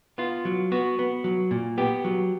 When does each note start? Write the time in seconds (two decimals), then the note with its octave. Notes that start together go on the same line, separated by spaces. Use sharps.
0.18 B3 F4
0.45 F#3
0.72 B3 F#4
0.99 B3
1.24 F#3
1.51 A#2
1.78 B3 G4
2.04 F#3